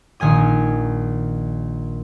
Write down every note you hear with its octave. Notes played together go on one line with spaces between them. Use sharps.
A#1 D#3 G#5 D#6